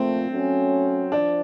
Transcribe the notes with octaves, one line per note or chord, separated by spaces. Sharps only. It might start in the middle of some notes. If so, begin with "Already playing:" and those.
Already playing: A#2 F3 A3 C4
F#3 A3 C#4
F3 D4